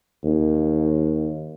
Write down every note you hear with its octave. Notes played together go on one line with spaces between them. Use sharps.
D#2